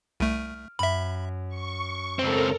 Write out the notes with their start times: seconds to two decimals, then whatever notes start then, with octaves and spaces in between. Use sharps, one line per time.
0.20 C2 A3 F6 D7 D#7
0.79 F#2 E5 B5
1.49 C#6
2.19 C#2 C4 A4 A#4 A#5